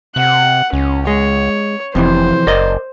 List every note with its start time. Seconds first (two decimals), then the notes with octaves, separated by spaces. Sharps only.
0.16 C3 F#5
0.73 C#2 C#4
1.07 G#3 C#5
1.95 F1 F2 C3 E3 C5
2.47 F#1 A#4 D5 D#5